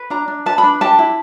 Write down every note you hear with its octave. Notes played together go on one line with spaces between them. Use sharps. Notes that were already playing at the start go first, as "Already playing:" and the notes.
Already playing: B4
D4 A#5
D4
B4 A5
B5
D4
G4 A5
E4